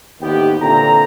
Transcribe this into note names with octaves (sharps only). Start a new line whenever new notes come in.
A1 D#2 C3 B3 G4
A#2 D3 E3 C4 A#5